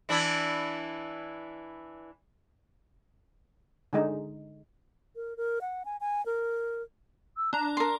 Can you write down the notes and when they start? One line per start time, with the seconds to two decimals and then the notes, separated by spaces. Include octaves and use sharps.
0.09 E3 D4 E4
3.93 D3 G#3 D#4
5.16 A#4
5.37 A#4
5.61 F#5
5.85 G#5
6.00 G#5
6.26 A#4
7.36 E6
7.53 D4 A5 A#5
7.77 A#4 A5 C6